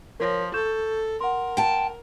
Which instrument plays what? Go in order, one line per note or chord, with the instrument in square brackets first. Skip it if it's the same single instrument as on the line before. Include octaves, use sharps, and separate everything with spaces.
[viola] F3 [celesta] A#4 C#5 A#6
[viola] A4 [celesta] C#6 G6 E7
[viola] A#4 [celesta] F#5 C6
[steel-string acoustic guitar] G5 A5